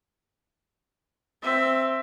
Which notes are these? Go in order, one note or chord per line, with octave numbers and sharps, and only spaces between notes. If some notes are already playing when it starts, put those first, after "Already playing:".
C4 E5